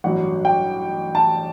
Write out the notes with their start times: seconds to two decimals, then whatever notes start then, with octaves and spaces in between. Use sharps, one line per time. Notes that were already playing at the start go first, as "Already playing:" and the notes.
0.04 A1 G2 F#3 F#5
0.45 G5
1.15 A5